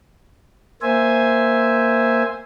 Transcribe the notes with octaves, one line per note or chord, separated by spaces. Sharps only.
A#3 C5 E5 G#5